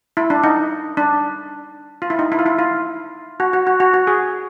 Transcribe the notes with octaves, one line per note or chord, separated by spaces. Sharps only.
E4
D4
D#4
D4
F4
E4
D#4
E4
F4
E4
F4
F#4
F#4
F#4
F#4
F#4
G#4